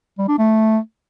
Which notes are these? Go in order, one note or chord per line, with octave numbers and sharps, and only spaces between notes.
G3
D4
A3